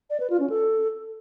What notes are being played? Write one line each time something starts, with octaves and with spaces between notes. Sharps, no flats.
D5
B4
F4
C#4
A4